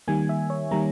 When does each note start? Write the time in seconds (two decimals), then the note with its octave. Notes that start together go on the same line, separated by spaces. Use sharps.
0.08 D#3 G3 A#3 G#5
0.29 E5
0.50 C#5
0.71 D#3 G3 A#3 A#5